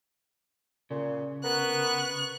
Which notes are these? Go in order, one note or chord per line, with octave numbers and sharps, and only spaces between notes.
A#2 C#3
B3 A#4 C#6 F#6